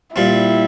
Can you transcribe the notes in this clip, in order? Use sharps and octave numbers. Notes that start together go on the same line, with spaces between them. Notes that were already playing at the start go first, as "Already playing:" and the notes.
A#2 G3 C4 E4